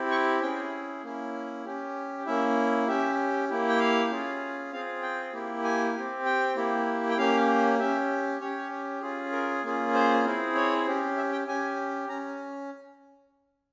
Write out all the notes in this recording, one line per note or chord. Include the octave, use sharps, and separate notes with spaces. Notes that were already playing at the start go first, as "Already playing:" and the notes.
Already playing: C4 E4 G4
C#6
C#4 E4 G#4 G5
A#3 C#4 E4
C#4 G4
A#3 C#4 E4 E5
C#4 G4 E5
A#3 E4 G4
G5
F5
C#4 F4 G#4
C4 F4 G#4 F5
G5
A#3 E4 G4
G#5
C4 G4
G5
A#3 E4 G4
G5
A#3 C#4 G4 F5
C#4 G4 E5
C#4 G4 C#5
C#4 F4 G#4
A#4
A#3 C#4 F4 G#4
C5
C4 E4 G#4
C#5
C#4 G4
E5
G5
C#4 G4 G#5
C#4 A#5